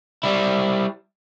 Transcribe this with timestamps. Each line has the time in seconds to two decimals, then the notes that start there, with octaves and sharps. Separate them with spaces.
0.23 G3 E4